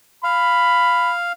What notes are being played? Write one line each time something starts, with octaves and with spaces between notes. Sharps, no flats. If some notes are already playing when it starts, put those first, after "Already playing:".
F5 B5